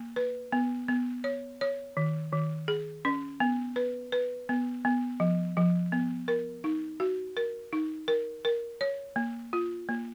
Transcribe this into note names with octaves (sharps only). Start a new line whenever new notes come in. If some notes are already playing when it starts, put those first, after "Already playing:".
Already playing: A#3
B4
B3
B3
C#5
C#5
D#3
D#3
G#4
C#4
B3
B4
B4
B3
B3
F3
F3
B3
A#4
D#4
F#4
A#4
D#4
A#4
A#4
C#5
A#3
F4
A#3